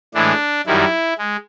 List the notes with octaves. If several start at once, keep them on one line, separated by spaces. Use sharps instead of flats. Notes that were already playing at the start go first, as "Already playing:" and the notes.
A2 E3 G#3 D4
F#2 D#3 G3 E4
G#3